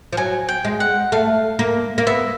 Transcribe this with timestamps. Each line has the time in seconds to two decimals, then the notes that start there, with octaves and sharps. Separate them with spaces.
0.13 F3
0.17 F#3 G#5
0.49 G5
0.65 G#3
0.80 F#5
1.12 A3 F5
1.59 A#3
1.98 A#3
2.07 B3 E5